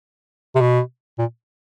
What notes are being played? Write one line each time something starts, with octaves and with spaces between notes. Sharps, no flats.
C3
B2
A#2